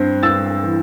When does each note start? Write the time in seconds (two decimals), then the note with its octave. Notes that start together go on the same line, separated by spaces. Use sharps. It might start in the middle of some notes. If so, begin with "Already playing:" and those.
Already playing: G2 C4
0.23 G2 E6 A6
0.63 E3